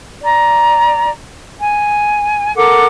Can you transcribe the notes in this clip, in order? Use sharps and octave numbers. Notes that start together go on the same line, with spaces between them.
D5 A#5
G#5
A4 A#4 F#5 D6